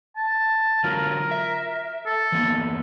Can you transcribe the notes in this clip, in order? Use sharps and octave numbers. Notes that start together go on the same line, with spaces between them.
A5
D3 F#3 F4 A#4
E5
A4
E3 A#3 B3